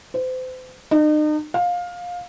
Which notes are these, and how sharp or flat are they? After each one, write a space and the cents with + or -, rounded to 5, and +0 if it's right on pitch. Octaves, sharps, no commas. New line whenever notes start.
C5 -35
D#4 -40
F5 +20